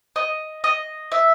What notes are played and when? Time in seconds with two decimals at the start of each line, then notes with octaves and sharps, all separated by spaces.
0.16 D#5
0.64 D#5
1.12 E5